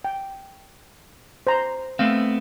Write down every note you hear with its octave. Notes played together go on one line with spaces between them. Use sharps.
G5
C5 A#5
A3 B3 C4 F5